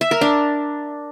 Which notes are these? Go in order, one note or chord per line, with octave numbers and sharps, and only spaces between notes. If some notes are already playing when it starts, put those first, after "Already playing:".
E5
A#4
D4